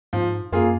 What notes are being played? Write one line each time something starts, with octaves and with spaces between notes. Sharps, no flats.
G#2 F3
F#2 A#3 F4 G#4